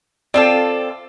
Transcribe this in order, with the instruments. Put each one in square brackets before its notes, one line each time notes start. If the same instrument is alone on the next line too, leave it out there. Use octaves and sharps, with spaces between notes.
[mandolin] C4 F4 A4 [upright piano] D5